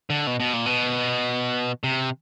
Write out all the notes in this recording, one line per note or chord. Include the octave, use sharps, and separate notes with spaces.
D3
B2
B2
A#2
B2
C3